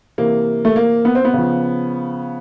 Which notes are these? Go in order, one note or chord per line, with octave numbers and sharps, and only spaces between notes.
C3 E3 A#3
A3
A#3
B3
C4
B3
C#3 F3